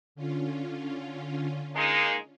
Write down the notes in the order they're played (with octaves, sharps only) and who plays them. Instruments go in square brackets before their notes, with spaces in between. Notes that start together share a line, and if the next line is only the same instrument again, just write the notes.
[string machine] D3 C#4 F4
[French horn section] G#3 A#3 D#4